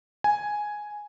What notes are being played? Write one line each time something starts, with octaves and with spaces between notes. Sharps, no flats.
G#5